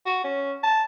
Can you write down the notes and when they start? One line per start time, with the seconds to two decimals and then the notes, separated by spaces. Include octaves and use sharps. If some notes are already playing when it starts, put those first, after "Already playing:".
0.06 F#4
0.24 C#4
0.63 A5